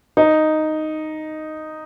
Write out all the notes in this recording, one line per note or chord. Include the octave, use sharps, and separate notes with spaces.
D#4